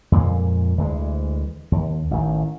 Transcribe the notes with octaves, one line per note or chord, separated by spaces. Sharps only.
F2 A#2 G#3 A#3
D2 E3 G#3
D#2
A1 D#3